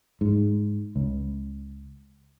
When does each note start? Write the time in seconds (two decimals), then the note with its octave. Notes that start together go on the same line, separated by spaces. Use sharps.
0.21 G#2
0.96 C#2